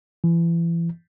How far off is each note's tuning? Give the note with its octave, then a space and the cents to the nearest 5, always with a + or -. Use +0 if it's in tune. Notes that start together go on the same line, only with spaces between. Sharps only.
E3 +30